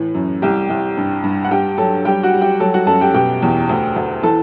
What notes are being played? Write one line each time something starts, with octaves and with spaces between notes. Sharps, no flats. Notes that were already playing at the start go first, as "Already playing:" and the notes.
Already playing: A2 E3
F#2
C2 G4 G5
C2
G2
G2
F#5
G2 G4 G5
F#3 A4 A5
G3 G4 G5
F#4 F#5
G3
G4 G5
F#3 A4 A5
F#4 F#5
F#2 A4 A5
G4 G5
B2 G4 G5
E2
D2
D2
E3 A4 A5